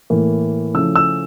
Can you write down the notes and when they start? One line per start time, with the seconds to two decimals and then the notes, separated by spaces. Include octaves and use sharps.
0.10 A2 E3 A#3
0.74 C#3 F3 A3 C#4 E4 E6
0.96 E6